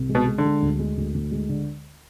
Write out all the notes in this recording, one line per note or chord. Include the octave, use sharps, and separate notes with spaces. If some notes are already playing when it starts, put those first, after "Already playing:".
Already playing: C2
G#3
B2
G#3
D3
G#3
D2
G#3
D2
D2
G#3
D3